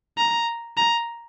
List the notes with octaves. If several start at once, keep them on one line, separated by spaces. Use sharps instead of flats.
A#5
A#5